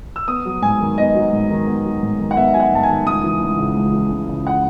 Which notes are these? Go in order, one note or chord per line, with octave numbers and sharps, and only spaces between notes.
E6
B3 D#6
F#3
G#2 G#5
D#3
B3 D#5
F#3
G#2
D#3
B3
F#3
G#2
D#3
F#5
B3 E5
F#3 G#5
F#5
G#2 A5
G#5
D#3
C#2 D#6
E3
C#2
C#3
C#2
E3
C#2
C#3
F#5